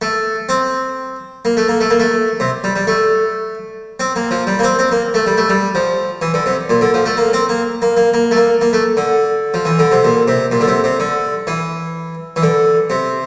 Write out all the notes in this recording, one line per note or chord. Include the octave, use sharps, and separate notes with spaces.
A3
C4
A#3
A3
A#3
A3
A#3
A3
C3
G3
G3
A3
C4
A#3
F3
G3
A#3
C4
C4
A#3
A3
G3
A3
G3
F3
E3
D3
C3
A#2
D3
F3
A3
A#3
C4
A#3
A#3
A#3
A#3
A3
A#3
A#3
A3
D3
F3
E3
D3
C3
A#2
C3
A#2
D3
C3
C3
D3
E3
E3
D3
C3